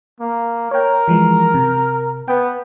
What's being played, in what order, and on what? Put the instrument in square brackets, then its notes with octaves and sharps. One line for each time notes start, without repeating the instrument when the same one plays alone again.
[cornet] A#3
[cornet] A#4 [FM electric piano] C#5 G5
[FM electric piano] E3 F3 G#3
C3
[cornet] B3 [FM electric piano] G5